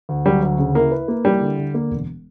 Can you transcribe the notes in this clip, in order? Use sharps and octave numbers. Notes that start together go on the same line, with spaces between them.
D2
F#3 G3
D2
C#3
A#3 E4
B4
A#3
G3 E4
D3
D3
A#3
E1